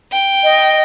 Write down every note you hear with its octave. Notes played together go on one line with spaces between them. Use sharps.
G5
D#5